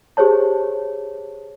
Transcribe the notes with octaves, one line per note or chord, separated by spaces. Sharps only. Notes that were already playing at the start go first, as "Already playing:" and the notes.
G4 G#4 C5 C#5 A5